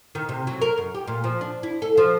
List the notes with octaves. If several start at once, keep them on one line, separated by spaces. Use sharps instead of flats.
D#3
C3
F#3
A#4
F#2
G4
A#2
F3
D4
E4
A4
F3